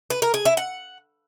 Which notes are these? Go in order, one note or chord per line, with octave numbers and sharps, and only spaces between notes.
B4
A#4
G#4
E4
F#5